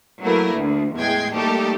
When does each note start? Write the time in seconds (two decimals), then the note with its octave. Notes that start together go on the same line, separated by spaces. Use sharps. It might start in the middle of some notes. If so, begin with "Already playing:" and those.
0.22 F#3 A3 A#3 E4 A#4 B4
0.57 D2
0.97 E2 A2 G#3 G5 G#6 C7
1.34 G3 A3 A#3 D#4 G4 A4